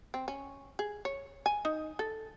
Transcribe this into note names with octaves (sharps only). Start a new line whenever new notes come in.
C4
C#4
G#4
C#5
G#5
D#4
A4